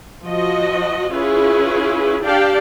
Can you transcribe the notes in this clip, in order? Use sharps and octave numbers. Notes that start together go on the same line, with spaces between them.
F3 F#4 D#5
C#4 E4 F4 G#4 B4
D4 G4 D5 F5 G5 A5